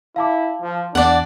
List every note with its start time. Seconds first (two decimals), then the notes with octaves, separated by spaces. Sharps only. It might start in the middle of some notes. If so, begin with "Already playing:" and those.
0.16 E4 F5 A5 D6
0.62 F3
0.95 E2 D4 D5 F#5